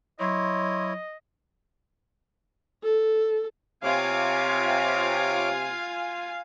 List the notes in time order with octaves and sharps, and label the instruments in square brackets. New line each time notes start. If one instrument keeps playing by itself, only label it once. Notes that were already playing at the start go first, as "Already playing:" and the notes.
[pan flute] F#3 [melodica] E4 C#5 [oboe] D#5 [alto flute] C6
[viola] A4
[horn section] C3 [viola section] F4 G#5 [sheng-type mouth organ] C#5 D6 [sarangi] F5